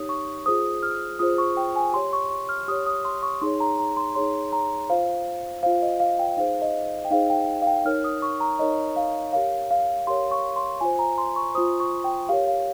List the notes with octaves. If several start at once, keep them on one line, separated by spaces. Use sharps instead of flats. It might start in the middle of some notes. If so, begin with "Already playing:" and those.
Already playing: D#4 G4 C#5 D#6
C#6
F4 G#4 C5 D#6
F6
F4 G#4 C5 D#6
C#6
G5
G#5
G4 C#5 C6
C#6
C#6
F6
G4 C#5 D#6
D#6
C6
C#6
D#4 G#4 C#5 C6
A#5
A#5
C6
D#4 G#4 C#5 C6
A#5
F4 C5 F5
F4 C5 F5
D#5
F5
G5
D#4 G#4 C5 F5
D#5
G5
D#4 G#4 C5 F5
G5
F5
G5
D#4 A#4 C#5 F6
D#6
C#6
A#5
D#4 A#4 C#5 D#5
F5
G4 A#4 C#5 F5
F5
G4 A#4 C#5 C6
C#6
C6
F4 C5 G#5
A#5
C6
C#6
F4 C5 D#6
C#6
G5
G4 A#4 C#5 F5
F5